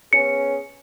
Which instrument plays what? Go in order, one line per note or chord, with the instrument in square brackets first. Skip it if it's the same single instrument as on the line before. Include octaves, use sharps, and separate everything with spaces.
[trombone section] B3 C#4 G#4 [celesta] C#7